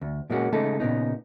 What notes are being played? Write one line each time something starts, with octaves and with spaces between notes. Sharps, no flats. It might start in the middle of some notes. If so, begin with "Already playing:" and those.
D2
A#2 G#3 A#3 C#4 F#4
C#3 G#3 A3 D#4 A4
A#2 C#3 B3 D#4